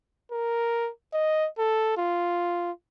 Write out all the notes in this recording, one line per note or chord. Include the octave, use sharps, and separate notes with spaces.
A#4
D#5
A4
F4